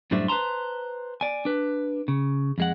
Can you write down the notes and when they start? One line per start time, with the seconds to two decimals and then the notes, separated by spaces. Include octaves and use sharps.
0.11 F#2 A2 G3 D4 C5 E5
0.28 B4 C5 A5 A#5 C6
1.21 D5 G#5
1.45 D4 B4
2.08 C#3
2.58 F2 G#3 F#5